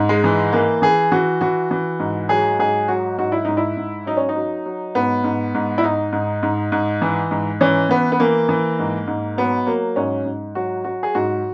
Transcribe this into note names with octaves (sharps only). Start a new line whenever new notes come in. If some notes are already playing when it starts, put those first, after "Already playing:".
Already playing: G#2
G#3
E3
E3 A#3
E3 G#4
E3 F#4
E3 F#4
E3
G#2
F#3 G#4
G#2 G#4
F#3 F#4
G#2 F#4
E4
G#2 D#4
E4
G#2
F#3 D#4
C#4
D#4
F#3
F#3
G#2 B3
G#2
G#2
E4
G#2 D#4
G#2
G#2
G#2
E3
G#2
E3 C#4
E3 B3
B3
E3 A#3
E3
G#2
G#2
F#3 B3
F#3 A#3
G#2 C#4
G#2
F#3 F#4
F#3 F#4
G#4
G#2 F#4